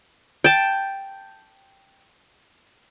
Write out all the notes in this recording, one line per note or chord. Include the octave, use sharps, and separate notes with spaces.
G5 A5